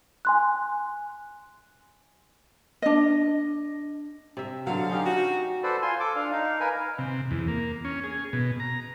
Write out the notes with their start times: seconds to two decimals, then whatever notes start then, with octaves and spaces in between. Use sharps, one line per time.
0.25 G#5 C6 F#6
2.82 D4 D#5
4.37 C3 E5
4.67 B2 D3 F#3 F5
4.90 C#4 D#4 G4
5.06 F#4
5.63 A4 B4 C5 D5
5.82 F4 G#5 C6
6.00 A4 D6
6.15 D4 F5
6.31 D#4 F5
6.60 A#4 B4 G#5
6.98 C3
7.31 E2
7.48 A#3
7.85 C#4
8.04 G#4
8.33 B2
8.60 A#5